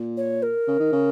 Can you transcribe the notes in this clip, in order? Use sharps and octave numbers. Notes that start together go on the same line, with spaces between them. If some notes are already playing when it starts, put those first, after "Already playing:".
Already playing: A#2
C#5
A#4
C#3
D#3
C#3